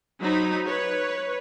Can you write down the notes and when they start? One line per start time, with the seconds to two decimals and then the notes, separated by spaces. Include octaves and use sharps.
0.20 F#3 D#4 C5 B5
0.67 B4 C#5